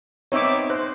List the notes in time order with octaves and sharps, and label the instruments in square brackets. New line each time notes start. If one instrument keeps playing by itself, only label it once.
[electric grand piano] B3 C4 D#4 [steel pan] C#5 E5 D6
[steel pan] C5 [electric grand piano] F#6